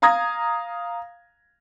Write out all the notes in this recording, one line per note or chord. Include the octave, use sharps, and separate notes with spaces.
F5 A#5 D#6 G#6 A#6